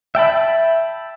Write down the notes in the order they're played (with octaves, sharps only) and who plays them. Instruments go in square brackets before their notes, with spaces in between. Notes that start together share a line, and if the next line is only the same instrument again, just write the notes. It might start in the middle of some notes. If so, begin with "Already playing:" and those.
[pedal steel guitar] E5 G5 A5 B5